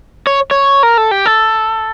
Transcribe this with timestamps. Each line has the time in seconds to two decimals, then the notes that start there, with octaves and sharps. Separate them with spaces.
0.27 C#5
0.51 C#5
0.83 A#4
0.97 A4
1.11 G4
1.25 A4